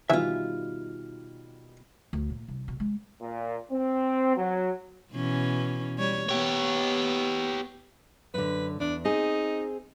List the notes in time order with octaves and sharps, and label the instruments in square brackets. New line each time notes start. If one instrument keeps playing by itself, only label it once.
[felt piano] B2 D#3 G3 [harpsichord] E3 [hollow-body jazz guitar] F4 E5
[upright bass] D2
A#2
C2
B2
G#3
[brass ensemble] A#2
C4
F#3
[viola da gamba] B2 E3 C#4
G3 C#5
[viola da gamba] B3 [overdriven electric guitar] G4 C#5
[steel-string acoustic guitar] F#2 D3 [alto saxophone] B4
[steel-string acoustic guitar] E2 [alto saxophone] D4
[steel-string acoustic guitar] C4 G#4 [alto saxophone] D#4